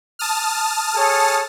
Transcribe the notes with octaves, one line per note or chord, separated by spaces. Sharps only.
A5 D#6 F6
G#4 A4 C#5